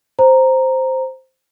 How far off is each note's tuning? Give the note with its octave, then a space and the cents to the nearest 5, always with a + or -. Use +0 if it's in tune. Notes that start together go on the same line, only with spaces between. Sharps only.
C5 +0 A#5 +0